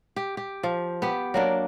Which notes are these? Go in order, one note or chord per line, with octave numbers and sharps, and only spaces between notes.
G4
G4
F3
B3 G4
F#3 A#3 D4